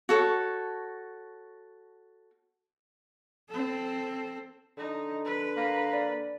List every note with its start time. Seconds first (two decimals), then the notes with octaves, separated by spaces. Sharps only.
0.09 F#4 A4 C#5
3.49 C4 A4
4.77 D3 D#4
5.25 B4
5.57 A#3
5.93 D5